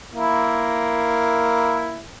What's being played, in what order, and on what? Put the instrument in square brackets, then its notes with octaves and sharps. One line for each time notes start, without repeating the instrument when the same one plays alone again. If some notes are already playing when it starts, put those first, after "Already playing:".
[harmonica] A#3 E4